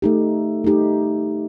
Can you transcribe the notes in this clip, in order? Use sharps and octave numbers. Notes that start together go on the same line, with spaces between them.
A3 D#4 G4
A3 D#4 G4